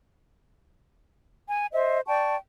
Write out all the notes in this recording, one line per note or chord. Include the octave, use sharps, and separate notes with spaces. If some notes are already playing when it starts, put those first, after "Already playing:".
G#5
C5 D#5 E5
D5 G5 A5 C#6